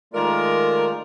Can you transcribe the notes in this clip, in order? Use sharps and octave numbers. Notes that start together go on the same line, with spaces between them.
D#3 G#3 A3 F4 A#4 D5